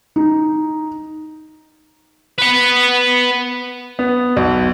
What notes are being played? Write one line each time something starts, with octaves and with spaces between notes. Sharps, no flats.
D#4
B4 F#5
B3
B1